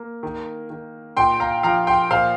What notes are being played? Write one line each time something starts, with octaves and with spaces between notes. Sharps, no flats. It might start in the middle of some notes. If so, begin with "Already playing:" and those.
Already playing: A#3
D#3
D#3
A#2 G5 C6
F5 A#5
F3 F5 A#5
G5 C6
A#2 C5 F5